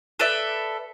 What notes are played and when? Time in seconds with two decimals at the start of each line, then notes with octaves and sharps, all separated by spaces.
0.19 A4 B4 D5 E5